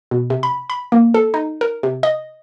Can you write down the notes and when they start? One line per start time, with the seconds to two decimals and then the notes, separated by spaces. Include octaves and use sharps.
0.11 B2
0.30 C3
0.43 B5
0.70 B5
0.92 A#3
1.14 A4
1.34 D#4
1.61 A#4
1.83 C3
2.03 D#5